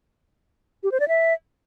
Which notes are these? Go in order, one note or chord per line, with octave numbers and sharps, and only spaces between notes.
G4
C5
D5
E5